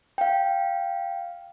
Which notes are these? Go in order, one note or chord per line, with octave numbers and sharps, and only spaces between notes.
F5 G5